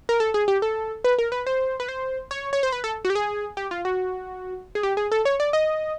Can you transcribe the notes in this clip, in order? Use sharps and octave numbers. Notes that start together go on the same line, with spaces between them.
A#4
A4
G#4
G4
A4
B4
A#4
B4
C5
B4
C5
C#5
C#5
C5
B4
A4
F#4
G4
G#4
G4
F4
F#4
G#4
G4
G#4
A4
C#5
D5
D#5